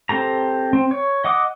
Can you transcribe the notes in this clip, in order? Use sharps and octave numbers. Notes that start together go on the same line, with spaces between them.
C4 G4 A4 A#5
C4
C#5
D#5 F#5 D6 D#6